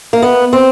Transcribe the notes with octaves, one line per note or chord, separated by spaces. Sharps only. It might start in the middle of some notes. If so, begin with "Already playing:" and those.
A#3
B3
C4